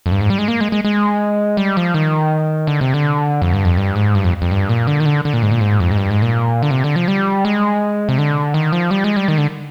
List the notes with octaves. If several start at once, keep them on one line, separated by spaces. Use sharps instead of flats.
F2
G2
G#2
G3
G#3
A#3
G#3
G#3
G#3
G3
F3
D#3
D3
C3
D3
F2
G2
F2
G2
G#2
G2
F2
F2
G2
A#2
D3
D#3
D3
D3
A#2
G#2
A#2
G#2
F2
G#2
G2
G#2
A#2
D3
C3
D3
F3
G3
G#3
C3
D3
D#3
F3
G3
G#3
G3
D#3
D3